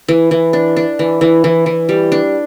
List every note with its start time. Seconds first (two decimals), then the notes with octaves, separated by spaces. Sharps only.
0.08 E3
0.31 E3
0.53 D4
0.77 D4
0.99 E3
1.21 E3
1.44 E3
1.66 E3
1.89 G3
2.12 D4